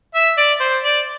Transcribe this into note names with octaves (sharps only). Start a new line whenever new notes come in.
E5
D5
C5
D5